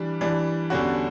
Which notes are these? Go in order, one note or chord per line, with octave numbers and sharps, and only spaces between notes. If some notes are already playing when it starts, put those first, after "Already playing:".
Already playing: E3 G3 D4
E3 G3 D4
E2 D3 G3 C#4 F#4